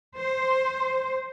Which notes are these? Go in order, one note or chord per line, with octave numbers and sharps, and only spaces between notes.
C5